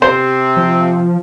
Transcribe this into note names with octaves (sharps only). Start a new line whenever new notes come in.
C3 C4 C5
F3